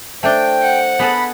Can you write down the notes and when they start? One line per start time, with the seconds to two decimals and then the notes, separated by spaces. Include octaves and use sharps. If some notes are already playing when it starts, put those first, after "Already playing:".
0.23 A3 D4 C5 G5
0.62 F#5
0.99 B3 G#4 A4 B5